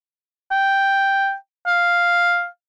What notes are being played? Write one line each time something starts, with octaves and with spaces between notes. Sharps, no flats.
G5
F5